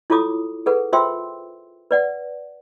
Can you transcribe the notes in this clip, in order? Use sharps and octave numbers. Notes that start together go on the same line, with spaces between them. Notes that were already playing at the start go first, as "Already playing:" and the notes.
E4 F4 A4 C#5 D6 D#6
G#4 A4 B4 F#5
F4 C5 E5 G5 C6 E6
B4 D5 F#5